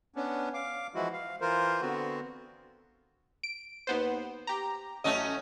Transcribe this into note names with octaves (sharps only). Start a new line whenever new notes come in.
B3 C#4 D4
F5 D6
E3 F3 G#3 E4 F#4
F5
E3 F4 A#4 C5
D3 B3 C4 F#4
D7
D#2 B3 C5
G4 A#5
A1 F#3 A3 C#4 D#5